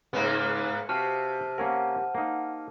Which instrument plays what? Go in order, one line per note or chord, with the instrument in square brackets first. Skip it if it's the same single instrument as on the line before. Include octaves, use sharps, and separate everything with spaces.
[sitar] G#2 A#3 B3 [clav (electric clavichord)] C#3
[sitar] C3 [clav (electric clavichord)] F#4 G4 F5 [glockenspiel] A5 F6 D#7
[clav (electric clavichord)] A#3 C#4 A#4 [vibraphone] F#5
[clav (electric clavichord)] A#3 D#4